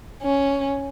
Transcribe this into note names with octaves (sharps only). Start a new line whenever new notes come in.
C#4